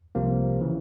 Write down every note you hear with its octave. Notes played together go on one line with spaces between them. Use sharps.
C2 C3 F3 A#3
C#3 E3